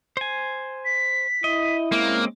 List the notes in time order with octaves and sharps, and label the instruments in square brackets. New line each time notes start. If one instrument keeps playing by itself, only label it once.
[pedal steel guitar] C5 G#5
[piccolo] B6
[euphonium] E4 [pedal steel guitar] D#5
[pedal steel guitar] G#3 C4 C#4 [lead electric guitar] A#3